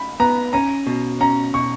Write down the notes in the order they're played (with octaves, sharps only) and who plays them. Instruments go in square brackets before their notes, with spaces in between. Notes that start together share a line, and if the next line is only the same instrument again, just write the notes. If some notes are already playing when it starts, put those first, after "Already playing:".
Already playing: [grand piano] B5
[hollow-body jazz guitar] B3 [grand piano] A#5
[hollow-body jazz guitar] C#4 [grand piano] A#5
[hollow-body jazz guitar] B2
[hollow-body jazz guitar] C#4 [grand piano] A#5
[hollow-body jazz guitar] B2 [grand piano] C#6